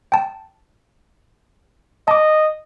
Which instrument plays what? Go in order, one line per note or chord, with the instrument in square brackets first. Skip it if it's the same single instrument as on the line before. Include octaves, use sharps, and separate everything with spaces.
[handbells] G5 A5
[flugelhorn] D#5 [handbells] A5 D6